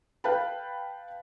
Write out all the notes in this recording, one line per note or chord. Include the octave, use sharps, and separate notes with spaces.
B4 F5 G5 A5 B5